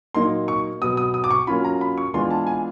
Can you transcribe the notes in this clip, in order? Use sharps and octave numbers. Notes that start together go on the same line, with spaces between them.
A#2 F#3 A#3 D#4 C6
C#6
B2 F#3 B3 D#6
D#6
D#6
D6
C#6
F#3 A#3 C#4 F4 B5
A#5
B5
C#6
E3 G#3 B3 D4 F4 C6
A5
G#5